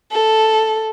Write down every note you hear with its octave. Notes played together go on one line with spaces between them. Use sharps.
A4